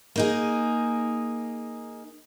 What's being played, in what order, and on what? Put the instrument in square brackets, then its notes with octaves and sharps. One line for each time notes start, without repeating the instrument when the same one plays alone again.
[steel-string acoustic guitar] A#3 D#4 G#4